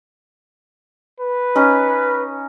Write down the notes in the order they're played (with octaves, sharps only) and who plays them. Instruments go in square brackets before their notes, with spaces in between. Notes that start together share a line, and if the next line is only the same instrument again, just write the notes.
[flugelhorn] B4
[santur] C#4 D#4